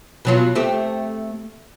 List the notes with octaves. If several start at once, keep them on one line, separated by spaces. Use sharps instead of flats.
B2 F#3 F4
A3 C4 G4